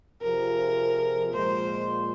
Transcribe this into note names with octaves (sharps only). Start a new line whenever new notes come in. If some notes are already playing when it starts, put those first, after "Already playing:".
F2 C3 F3 C4 G#4 A#4
A#2 F3 G#3 C5